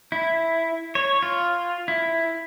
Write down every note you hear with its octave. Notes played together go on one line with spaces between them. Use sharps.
E4
C#5
F4
E4